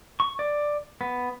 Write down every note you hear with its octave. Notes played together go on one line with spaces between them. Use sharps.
C#6
D5
B3